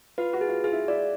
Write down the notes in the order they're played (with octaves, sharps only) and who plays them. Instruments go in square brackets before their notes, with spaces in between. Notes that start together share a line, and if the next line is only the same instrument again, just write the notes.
[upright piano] F4 [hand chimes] B4
[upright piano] F#4
[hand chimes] G#4
[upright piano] F4
[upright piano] F4 [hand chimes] G#4
[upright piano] E4
[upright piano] E4 [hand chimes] D5